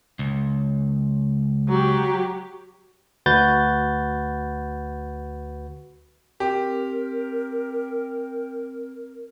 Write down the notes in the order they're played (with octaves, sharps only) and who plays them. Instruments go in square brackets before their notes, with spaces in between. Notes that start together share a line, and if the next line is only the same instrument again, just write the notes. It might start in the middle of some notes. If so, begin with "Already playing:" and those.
[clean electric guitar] C#2
[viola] F#3 G4
[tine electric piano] D2 F#4 B4 G6 A6
[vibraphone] C4 [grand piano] G4 [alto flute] A#4